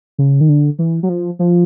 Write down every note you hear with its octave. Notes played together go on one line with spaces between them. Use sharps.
C#3
D#3
D3
E3
F#3
F3
F3